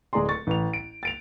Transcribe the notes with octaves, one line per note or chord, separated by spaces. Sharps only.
D1 G#3 G#4 D5 A#5 C6
C#6 A6
A1 F7
D7
A6 D7 F7